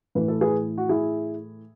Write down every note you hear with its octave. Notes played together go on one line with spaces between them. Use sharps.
A2 E3 B4
A4
G#4 B4
F#4
E4 G#4